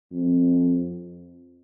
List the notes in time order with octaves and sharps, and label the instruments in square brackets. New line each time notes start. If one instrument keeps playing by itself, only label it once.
[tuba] F2